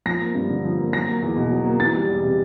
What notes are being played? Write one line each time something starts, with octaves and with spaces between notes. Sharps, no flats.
F3 A#6
A#3
G2
D3
F3
A#3
F#3 A#6
A#3
E2
B2
F#3
A#3
E3 A6
G3
E2
C3